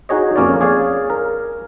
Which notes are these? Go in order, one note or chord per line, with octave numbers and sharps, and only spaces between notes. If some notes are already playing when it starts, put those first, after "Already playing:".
D#4 F#4 G#4 C#5 D#5
F2 A#3 C#4 A#4 C#5 D5
G#4 C#5 D5 F5
A#4